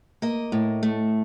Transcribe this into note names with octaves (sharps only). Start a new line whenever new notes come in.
A#3 D#5
A2
A3